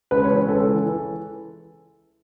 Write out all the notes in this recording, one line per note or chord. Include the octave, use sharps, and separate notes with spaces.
C#2 B4
C#5
E3
B4
C#2 A4
E3
E3